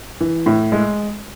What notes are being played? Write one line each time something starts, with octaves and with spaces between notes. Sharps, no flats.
E3
A2
G#3